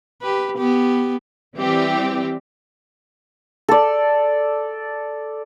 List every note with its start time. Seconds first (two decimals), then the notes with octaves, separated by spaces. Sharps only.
0.21 G4 B4
0.58 B3 G4
1.58 E3 G3 C4 G4
3.68 A4 D5